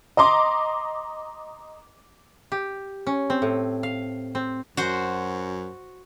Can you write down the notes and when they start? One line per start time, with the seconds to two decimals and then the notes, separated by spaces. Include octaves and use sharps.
0.17 D#5 A#5 C6 D6
2.52 G4
3.07 C#4
3.30 C4
3.42 A2
3.83 F5
4.35 C4
4.77 F#2 F#4 C5